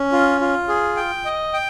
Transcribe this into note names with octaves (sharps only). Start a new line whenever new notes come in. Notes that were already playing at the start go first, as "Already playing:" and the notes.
Already playing: C#4
F4
F4
G#4
G5
D#5
G5